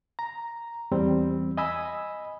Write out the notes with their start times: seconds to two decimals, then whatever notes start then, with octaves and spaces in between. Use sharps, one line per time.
0.19 A#5
0.91 E2 G3 C4
1.57 D#5 G#5 B5 E6